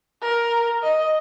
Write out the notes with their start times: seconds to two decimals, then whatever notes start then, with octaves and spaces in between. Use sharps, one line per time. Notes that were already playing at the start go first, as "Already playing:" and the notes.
0.22 A#4
0.83 D#5